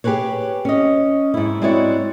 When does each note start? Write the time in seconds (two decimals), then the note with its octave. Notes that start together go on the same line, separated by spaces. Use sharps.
0.04 G4 G#4 A#4 B4 C#5
0.65 C#4 D#5
1.34 G#2 E4
1.62 G#3 C4 E4 F#4 C#5 D5